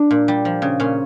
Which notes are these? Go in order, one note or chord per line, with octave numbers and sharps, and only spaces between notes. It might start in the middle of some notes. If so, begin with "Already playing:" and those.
Already playing: D4
A#2
G3
F3
C#3
A#2 C#4